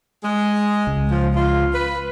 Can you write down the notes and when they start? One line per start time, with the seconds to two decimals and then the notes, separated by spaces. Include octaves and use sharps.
0.23 G#3
0.87 C#2
1.09 F3
1.34 F4
1.73 B4